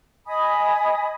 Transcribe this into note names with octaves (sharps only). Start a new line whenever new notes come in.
D#5 G#5 B5 D#6